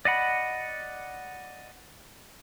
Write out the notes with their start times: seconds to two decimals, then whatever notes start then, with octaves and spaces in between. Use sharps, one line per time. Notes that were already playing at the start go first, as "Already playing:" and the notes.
0.05 D5 D#5 F#5 B5